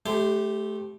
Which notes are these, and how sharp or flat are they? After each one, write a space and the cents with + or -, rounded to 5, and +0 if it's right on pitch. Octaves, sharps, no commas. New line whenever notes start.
A3 -25 G4 +0 C5 -20